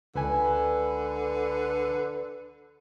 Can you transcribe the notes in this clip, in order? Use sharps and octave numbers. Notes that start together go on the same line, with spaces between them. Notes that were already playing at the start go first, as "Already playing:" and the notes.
C#2 D3 B4 G#5